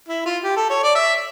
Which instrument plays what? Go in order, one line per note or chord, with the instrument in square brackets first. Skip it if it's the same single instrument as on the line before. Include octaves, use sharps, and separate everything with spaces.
[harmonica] E4
F4
G4
A4
C#5
D5
E5